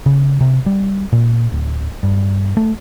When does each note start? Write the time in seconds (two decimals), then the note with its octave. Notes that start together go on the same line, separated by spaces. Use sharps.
0.06 C#3
0.41 C3
0.66 G3
1.12 A#2
1.52 D1
2.03 G2
2.57 A3